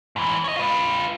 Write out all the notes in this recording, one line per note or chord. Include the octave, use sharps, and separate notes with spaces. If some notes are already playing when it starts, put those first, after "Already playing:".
G#2 E3
C#5 D#5
F4 B4